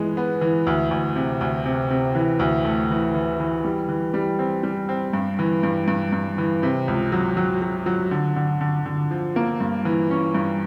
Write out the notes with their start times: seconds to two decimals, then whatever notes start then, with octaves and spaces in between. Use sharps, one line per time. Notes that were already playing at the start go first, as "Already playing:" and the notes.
Already playing: E3 G#3 B3
0.17 B3
0.41 E3
0.67 D2
0.91 D2
1.16 C3
1.41 D2
1.65 C3
1.91 C3
2.15 E3
2.39 D2
2.65 A3
2.90 E3
3.14 E3
3.40 E3
3.65 G3
3.89 E3
4.14 G3
4.39 C4
4.63 G3
4.89 C4
5.13 G2
5.39 E3
5.63 G2
5.88 G2
6.13 G2
6.38 E3
6.63 C3
6.88 C#2
7.12 F#3
7.37 F#3
7.62 F#3
7.86 F#3
8.11 D3
8.36 D3
8.61 D3
8.86 D3
9.11 F3
9.36 A#3
9.60 G2
9.85 E3
10.10 C#4
10.35 G2